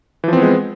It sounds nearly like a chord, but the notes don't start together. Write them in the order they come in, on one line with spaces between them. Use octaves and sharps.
E3 F3 C4 B3 G#3